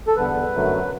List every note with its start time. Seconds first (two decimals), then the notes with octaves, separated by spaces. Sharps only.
0.07 A4
0.16 E2 D3 G3 B3 B4
0.53 F#2 D3 F#3 A3